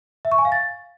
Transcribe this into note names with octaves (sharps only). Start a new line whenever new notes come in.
E5
C#6
G#5
F5
A6